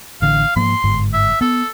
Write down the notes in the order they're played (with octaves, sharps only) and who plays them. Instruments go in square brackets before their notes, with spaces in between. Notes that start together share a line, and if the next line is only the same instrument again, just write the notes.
[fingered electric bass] A1 D3 [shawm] F5
[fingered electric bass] G#2 F3 A#3 [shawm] C6
[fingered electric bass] G1 G#2
[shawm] E5
[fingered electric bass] B3 [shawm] A4